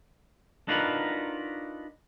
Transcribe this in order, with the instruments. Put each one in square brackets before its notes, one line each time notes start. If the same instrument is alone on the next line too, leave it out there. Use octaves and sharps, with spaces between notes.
[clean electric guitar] D4 D#4 F4 F#4 A#4 B4